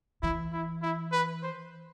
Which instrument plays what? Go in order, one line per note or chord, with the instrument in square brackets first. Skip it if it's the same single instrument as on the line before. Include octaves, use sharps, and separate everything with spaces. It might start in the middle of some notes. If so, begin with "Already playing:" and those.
[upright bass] E3 [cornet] E4
[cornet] E4
E4
B4
C5